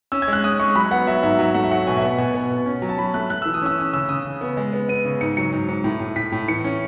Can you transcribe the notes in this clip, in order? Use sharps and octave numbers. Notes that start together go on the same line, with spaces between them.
C#4 E6
G#6
G#3
F#6
C#4 D#6
G#3 C#6
F#3 B5
B3 F#5
F#3 E5
G#2 E5
F#3 E5
A3 F#5
E5
F#3 F#5
B2 G#5
E5
B3 F#5
B2 G#5
B3
B2
C#4
F#3
A5
F#3 B5
A3 F#6
A3 F#6
E3 E6
D#6
C#4 E6
C#4
C#3 E6
C#3 D#6
C#3
B3
G#3
B3
B3 D#7
C#3
G#2 C#7
F#3 C#7
G#2
G#2
A2
A2
A2 B6
A2
E3 C#7
C#4